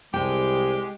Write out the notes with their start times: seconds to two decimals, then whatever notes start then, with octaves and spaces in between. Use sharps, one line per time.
0.14 C2 G#3 G4 G5